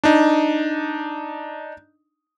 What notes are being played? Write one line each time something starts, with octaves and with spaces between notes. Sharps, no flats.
D4 D#4